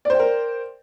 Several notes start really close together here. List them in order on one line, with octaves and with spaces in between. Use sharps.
D5 C5 G5 A#4